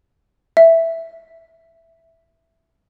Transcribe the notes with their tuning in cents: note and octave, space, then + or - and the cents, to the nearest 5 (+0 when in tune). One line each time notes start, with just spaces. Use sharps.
E5 +0